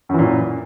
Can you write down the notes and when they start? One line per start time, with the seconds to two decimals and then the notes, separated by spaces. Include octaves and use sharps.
0.09 F#2
0.14 E3
0.18 A#2